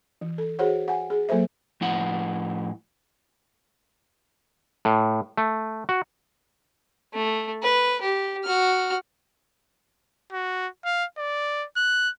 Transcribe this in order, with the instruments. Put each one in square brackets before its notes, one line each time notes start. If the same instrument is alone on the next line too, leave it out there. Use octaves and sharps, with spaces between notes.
[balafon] E3
A4
F#4 G#4 C5 C#5 F#5
F#5 G#5
G#4
F#3 A#3 A4 C5 E5
[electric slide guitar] A2 F3 E4 F#5
[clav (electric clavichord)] A2
A3
F#4
[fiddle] A3
B4
G4
F#4 F6
[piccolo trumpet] F#4
F5
D5
F#6